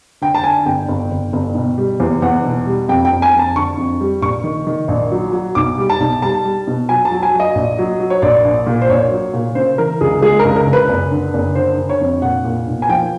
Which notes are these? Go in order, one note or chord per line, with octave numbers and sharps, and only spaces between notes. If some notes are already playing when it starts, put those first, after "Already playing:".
D3 G5
A5
D3 G#5
G1 G5
G1
G1
G1
B2
G3
E2
E2 F#5
B2
G3
F2 G5
G5
F2
G#5
F2
A5
D3 C#6
F2
G3
A#1 C#6
D#3
D#3
A#1
F#3
F#3
B1 D6
G3
A5
B1
G3 A5
G3
B2
F#3 G#5
A5
F#3
G#5
F#3
D#5
A#1
F#3
F#3
C#5
A#1 D5
A#1
A#2
C5
A#1 C#5
F#3
A#2
C#3 C5
E3 A#4
C#2 G#4
G#3 G#4
A#4
C#2
A#4
C#2
B4
F#1
D3
F#1
D3 C5
D3
C#5
F2
A#2 F#5
A#2
B1
G#5
F3 G5